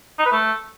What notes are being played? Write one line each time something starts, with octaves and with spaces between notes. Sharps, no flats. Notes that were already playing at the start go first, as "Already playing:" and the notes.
D#4
B4
A3